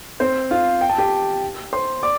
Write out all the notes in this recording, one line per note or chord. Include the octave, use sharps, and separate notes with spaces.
C4 C5
F4 F5
G5
A5
G4 G5
C5 C6
D5 D6